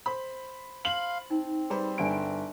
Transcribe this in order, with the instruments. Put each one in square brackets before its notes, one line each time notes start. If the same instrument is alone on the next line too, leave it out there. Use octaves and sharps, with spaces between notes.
[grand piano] C5 B5
[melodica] F5 C6 [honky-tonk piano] F#7
[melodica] C4 [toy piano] D#4
[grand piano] G3 B4 C5 [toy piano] G#4
[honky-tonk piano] G1 D7 [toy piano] D5 F5 G#5